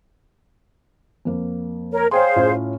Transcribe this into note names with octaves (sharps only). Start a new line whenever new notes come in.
F2 A#3
A#4 C#5
G#4 C5 C#5 F5 G5 C6
A2 C#4 F4